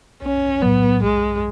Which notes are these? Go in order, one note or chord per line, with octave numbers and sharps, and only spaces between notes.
B1 C#4
A2 F#3 B3
B1 G#3